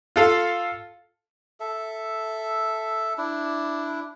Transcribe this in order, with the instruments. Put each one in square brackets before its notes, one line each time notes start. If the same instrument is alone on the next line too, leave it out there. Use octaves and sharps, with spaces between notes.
[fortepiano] F4 A4 F5
[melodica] A4 E5
D4 E4